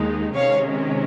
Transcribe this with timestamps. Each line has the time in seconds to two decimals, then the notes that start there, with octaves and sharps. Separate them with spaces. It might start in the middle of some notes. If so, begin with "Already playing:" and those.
Already playing: D#2 D#3 G#3 D#4
0.34 C3 D#3 G#3 C#4 C#5 F5